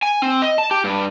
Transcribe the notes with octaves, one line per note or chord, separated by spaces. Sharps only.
G#5
C4
D#5
A5
G4
G2